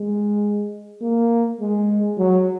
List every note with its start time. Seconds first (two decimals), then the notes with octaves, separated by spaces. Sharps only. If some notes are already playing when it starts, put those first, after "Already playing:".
Already playing: G#3
1.01 A#3
1.60 G#3
2.18 F#3